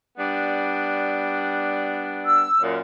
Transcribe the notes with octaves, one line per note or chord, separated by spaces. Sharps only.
G3 B3 D4
E6
F#2 A#2